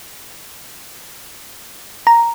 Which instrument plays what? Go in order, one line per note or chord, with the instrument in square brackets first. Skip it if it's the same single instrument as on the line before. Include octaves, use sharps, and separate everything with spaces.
[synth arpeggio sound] A#5